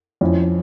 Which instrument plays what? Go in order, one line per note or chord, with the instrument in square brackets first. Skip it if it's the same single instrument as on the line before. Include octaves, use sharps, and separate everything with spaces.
[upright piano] F2 C#4 E4